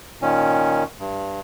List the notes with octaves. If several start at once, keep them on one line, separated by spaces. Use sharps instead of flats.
A#2 D#3 C#4
G2